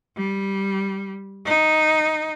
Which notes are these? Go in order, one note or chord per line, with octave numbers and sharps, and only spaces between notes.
G3
D#4